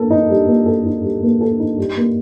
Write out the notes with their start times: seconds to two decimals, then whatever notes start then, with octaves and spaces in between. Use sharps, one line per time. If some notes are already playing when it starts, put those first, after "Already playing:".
Already playing: A#3 A4
0.10 D#4
0.30 G3
0.48 A#3
0.66 A4
0.85 D#4
1.03 G3
1.23 A#3
1.41 A4
1.60 D#4
1.78 G3
1.97 A#3